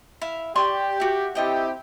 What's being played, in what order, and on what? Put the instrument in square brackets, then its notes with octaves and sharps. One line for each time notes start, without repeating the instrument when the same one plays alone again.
[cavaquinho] E4 E5 F5
[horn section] G4 [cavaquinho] D5 C6 C#6
[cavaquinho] F#4 E5
[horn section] C4 E4 G4 [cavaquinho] A4 D#5 G5